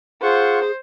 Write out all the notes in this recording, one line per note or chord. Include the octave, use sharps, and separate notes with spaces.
F4 G#4 C5 F#5 C#6